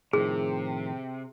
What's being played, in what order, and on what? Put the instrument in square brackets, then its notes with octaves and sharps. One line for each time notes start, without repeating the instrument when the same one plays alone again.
[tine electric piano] A2 D#3 F3 [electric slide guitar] C3 [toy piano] G#4